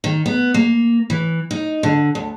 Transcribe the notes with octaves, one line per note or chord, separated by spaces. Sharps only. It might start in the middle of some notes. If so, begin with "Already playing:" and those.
D#3
B3
A#3
E3
D#4
D3
D2